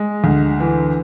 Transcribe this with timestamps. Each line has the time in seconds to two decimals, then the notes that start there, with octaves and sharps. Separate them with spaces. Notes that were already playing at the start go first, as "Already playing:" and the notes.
Already playing: G#3
0.24 D2
0.60 E3